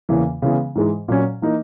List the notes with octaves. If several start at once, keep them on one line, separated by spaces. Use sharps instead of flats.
E2 C#3 E3 A#3
C#3 E3 G#3 B3
G#2 E3 G#3
A#2 F#3 C#4
E3 A#3 D#4